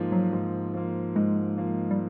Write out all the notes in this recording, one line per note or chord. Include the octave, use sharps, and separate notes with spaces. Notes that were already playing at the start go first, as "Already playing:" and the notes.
Already playing: G#2 F3 A#3
F#3
G#2
F3 A#3
G#2 G#3
F3 A#3
G3